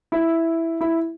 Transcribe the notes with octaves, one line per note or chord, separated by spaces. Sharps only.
E4
E4